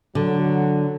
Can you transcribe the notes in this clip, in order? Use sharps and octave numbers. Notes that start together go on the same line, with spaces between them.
D3 F#3